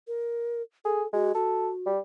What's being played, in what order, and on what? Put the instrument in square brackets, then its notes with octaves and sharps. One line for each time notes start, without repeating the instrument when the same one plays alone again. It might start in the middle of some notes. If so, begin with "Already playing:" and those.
[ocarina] A#4
[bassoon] G#4 [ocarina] A4
[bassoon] G#3 [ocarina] F#4
[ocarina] F#4 [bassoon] A4
[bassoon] G3